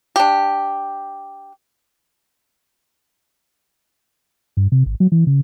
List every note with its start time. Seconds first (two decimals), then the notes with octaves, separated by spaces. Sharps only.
0.16 D4 G4
4.57 G2
4.72 C3
4.86 G#1
5.00 F#3
5.12 E3
5.27 C#3